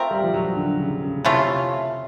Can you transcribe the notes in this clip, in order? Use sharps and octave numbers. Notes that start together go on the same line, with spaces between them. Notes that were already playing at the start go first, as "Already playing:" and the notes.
Already playing: A3 C4 F4 A#4
G3
F3
F#3
D3
C#3
C#3
C3 E3 A3 C#4 F4